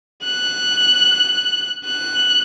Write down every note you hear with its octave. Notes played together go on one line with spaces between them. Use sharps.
F#6
F#6